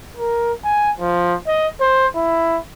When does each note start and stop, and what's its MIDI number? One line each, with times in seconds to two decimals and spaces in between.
0.17 0.52 70
0.64 0.90 80
1.00 1.35 53
1.47 1.68 75
1.81 2.07 72
2.15 2.59 64